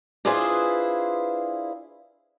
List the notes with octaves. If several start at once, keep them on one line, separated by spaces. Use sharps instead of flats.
D4 E4 F4 G#4 B4 C5